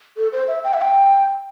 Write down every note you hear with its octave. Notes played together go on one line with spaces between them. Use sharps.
A4
C5
E5
G5
E5
G5